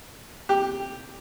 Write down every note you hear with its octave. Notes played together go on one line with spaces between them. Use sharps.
G4